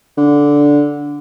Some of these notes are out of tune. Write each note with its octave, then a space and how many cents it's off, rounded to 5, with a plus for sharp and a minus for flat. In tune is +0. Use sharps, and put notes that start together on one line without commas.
D3 -10